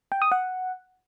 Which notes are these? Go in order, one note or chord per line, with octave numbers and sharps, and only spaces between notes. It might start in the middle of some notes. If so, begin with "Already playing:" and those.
G5
D#6
F#5